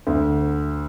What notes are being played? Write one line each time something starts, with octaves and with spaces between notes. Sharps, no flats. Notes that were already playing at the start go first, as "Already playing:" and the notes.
D2